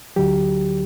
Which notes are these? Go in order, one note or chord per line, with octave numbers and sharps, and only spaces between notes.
D2 D3 F#3 G4